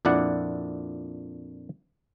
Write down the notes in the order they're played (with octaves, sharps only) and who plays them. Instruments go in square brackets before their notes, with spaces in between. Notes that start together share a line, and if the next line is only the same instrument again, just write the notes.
[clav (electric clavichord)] F2 A#2 D4 E4 D5 F#5